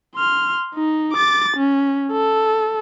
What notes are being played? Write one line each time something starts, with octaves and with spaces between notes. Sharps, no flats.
C6 F6
D#4
D6 A6
C#4
A4